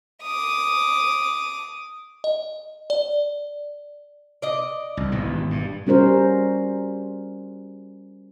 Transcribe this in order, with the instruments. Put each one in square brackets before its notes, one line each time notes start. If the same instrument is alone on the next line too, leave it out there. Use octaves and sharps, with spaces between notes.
[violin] D6 D#6
[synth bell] D#5
D5
[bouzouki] D5 D#5
[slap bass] C2
G#1 B2 E3
G2
[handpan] G3 C#4 F#4 A#4 C5